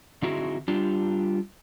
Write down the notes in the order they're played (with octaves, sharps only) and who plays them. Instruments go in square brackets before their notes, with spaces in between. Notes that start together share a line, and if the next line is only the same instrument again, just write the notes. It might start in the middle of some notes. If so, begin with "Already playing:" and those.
[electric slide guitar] D3 C4 D#4 E4 F#4 G#4
G3 D4 F4 G4